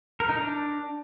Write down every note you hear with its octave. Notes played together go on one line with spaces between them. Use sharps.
A#4
D#4
D4